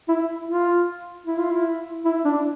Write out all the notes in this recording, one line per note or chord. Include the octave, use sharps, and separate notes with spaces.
E4
F4
E4
F4
E4
E4
D4